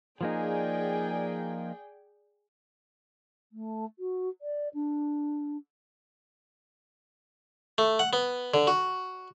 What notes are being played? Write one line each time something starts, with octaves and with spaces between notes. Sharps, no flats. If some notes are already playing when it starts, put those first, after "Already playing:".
F3 A#3 D#4 G#4 D5 G5
A3
F#4
D5
D4
A3
F#5
B3
D3
F#4